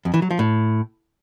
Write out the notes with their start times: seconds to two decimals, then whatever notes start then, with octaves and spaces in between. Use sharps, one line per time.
0.05 F2
0.14 E3
0.22 F#3
0.31 F3
0.39 A2